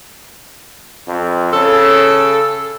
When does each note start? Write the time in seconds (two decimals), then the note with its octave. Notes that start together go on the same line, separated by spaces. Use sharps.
1.07 F2
1.53 C#3 A4